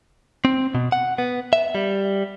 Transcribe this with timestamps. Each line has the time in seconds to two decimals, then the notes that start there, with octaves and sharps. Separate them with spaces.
0.45 C4
0.75 B2
0.92 F#5
1.18 B3
1.53 E5
1.75 G3